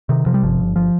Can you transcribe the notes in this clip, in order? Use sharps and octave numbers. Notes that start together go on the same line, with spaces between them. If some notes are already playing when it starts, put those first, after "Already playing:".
C3 D#3
C3 F3
G3
G1 F3
G1
F3